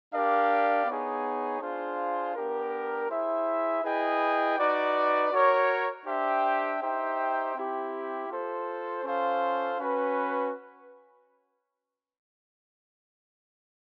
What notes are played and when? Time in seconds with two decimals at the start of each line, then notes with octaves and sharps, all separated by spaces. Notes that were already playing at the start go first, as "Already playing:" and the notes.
0.12 D4 G4 A#4 D5 F5
0.86 B3 D#4 G#4 C#5
1.61 D4 F4 G#4 C5 F5
2.35 B3 D4 G4 A#4
3.10 E4 G#4 C5 E5
3.83 E4 G#4 B4 D#5 G5
4.58 D#4 F#4 B4 D5
5.32 F#4 A#4 C#5
6.06 D4 G4 C5 E5 G5
6.81 D#4 G4 C5 E5 G5
7.55 C4 E4 G4
8.29 F4 A4 C5
9.03 C#4 F4 A4 C5 F5
9.78 C#4 F#4 B4